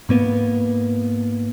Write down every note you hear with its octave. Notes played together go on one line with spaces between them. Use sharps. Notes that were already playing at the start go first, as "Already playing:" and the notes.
G#2 A#3 B3